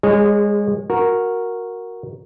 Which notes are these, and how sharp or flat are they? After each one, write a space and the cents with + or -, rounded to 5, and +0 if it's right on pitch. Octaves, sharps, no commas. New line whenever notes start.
G#3 -30 G#4 +0 C#5 -20
F#4 -10 A#4 +0